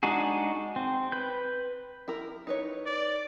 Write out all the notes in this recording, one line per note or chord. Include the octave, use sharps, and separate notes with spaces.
G#3 D4 D#4 F#4 G#4
C4
B4 G6
E4 A#4
D#4 B4 C#5
D5